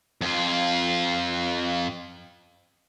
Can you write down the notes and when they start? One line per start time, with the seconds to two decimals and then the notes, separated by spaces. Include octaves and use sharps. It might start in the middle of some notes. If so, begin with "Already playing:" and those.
0.21 F2 F4